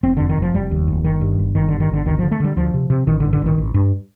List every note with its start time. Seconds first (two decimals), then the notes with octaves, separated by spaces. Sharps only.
0.03 F1 C4
0.17 F2 D3
0.29 D#3
0.37 F1 F3
0.54 F1 G3
0.71 D#2
0.88 F1
1.04 G1 D#3
1.21 G2
1.39 G1
1.55 G1 D#3
1.68 G2 D3
1.80 D#3
1.90 G1 D3
2.06 D2 D#3
2.19 D3 F3
2.31 A3
2.40 D3 G3
2.57 D2 F3
2.74 C3
2.90 C3
3.07 A1 D#3
3.20 D3
3.24 G2
3.33 D3
3.42 A1 D#3
3.58 A1
3.74 G2